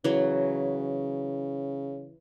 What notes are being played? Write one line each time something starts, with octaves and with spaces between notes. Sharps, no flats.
C#3 E3 F#3